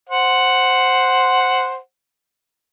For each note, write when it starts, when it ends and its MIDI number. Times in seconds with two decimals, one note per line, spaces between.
0.09 1.77 72
0.09 1.77 78